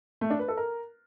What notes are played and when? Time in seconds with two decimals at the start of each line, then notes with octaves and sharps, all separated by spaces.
0.21 A3
0.30 D4
0.39 B4
0.48 A4
0.57 A#4